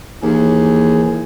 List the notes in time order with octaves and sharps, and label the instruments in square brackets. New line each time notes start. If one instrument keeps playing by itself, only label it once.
[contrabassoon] D#2 [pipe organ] E3 G#4